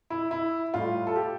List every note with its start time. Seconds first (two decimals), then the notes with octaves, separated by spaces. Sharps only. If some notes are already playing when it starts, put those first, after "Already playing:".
0.10 E4
0.31 E4
0.74 A2 G3 F4
1.07 A4
1.16 G4